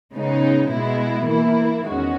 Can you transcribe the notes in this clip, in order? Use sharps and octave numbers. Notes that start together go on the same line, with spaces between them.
C#3 G#3 B3 D#4
B2 G#3 B3 E4
E3 A#3 E4
E2 D#3 G#3 C#4 F#4